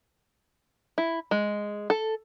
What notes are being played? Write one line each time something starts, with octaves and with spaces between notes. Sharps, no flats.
E4
G#3
A4